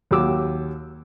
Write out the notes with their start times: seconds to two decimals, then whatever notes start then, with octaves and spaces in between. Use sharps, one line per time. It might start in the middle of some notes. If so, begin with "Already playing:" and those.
0.11 D#2 F#3 G4 D6 E6